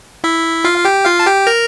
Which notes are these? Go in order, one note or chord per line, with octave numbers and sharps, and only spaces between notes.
E4 E5
F4 F5
F5
G4 G5
F4 F5
A5
G4 G5
A#4 A#5